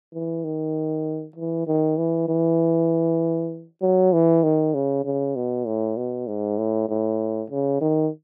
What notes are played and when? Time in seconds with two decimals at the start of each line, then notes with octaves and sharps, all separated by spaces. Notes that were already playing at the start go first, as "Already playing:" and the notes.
0.13 E3
0.44 D#3
1.36 E3
1.67 D#3
1.98 E3
2.28 E3
3.82 F#3
4.13 E3
4.43 D#3
4.74 C#3
5.04 C#3
5.36 B2
5.66 A2
5.97 B2
6.28 G#2
6.58 A2
6.89 A2
7.50 C#3
7.81 D#3